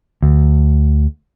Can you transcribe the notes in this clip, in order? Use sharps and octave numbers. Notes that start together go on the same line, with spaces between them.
D2